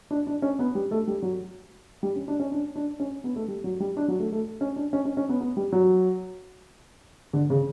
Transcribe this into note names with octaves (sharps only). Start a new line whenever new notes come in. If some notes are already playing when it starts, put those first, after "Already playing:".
D4
D4
C#4
B3
G3
A3
G3
F#3
G3
C#4
D4
C#4
D4
D4
C#4
B3
A3
G3
F#3
G3
D4
F#3
A3
A3
C#4
D4
C#4
C#4
C#4
B3
B3
G3
F#3
D3
C#3